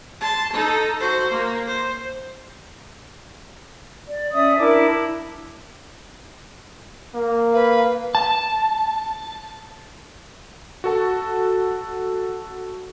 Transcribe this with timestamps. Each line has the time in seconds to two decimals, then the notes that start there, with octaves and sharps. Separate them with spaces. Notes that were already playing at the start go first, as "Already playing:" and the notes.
0.21 A5 C6
0.52 D#4 A4
1.00 F#4 C5
1.30 A#3
1.67 C5
4.07 D5
4.33 C#4 D5 E5 D#6
4.58 D4 E4 A#4 D6
7.15 A#3
7.53 B4 F5
8.15 A5
10.84 F#4 A4 A5